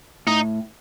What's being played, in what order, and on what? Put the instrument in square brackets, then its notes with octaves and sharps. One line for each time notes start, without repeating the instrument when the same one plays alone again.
[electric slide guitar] A2 [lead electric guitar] D#4